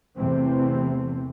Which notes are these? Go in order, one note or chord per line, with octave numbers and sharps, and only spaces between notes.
E2 C3 E3 A3 C4